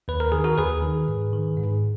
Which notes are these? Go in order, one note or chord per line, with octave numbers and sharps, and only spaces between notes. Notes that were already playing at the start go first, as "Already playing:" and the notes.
D#2 B4
A#4
D#3 G#4
F#4 A#4
D#2 G#4 B4
D#3
G#2
D#3
G#2